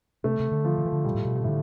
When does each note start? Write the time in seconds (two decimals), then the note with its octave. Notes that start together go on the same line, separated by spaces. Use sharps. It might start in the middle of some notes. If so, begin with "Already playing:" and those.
0.24 C3 A3
0.40 C3
0.51 D3
0.65 F3
0.78 D3
0.85 E3
0.92 D3
1.05 B2 G3
1.14 A2
1.25 B2
1.35 C3
1.44 A2 D3